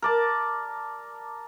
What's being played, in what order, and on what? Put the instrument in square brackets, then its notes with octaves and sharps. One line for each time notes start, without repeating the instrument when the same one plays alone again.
[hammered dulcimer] A#4 D5 A5